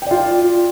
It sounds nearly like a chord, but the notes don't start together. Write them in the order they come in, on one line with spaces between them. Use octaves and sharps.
G5 D5 F4